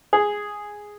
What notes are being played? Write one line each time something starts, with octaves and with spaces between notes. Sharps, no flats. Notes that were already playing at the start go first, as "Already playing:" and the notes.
G#4